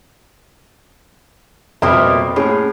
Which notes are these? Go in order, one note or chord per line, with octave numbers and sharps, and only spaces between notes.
F2 B2 G3 A#3 E5
A2 C#4 G#4